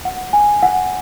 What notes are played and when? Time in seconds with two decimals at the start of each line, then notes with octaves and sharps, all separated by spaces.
0.05 F#5
0.33 G#5
0.63 F#5